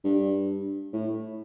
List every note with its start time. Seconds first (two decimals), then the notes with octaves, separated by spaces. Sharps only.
0.04 G2
0.93 A2